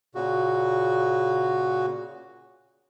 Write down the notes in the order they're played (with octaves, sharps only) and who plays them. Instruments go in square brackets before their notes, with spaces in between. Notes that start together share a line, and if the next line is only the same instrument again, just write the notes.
[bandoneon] A#2 C#3 F#4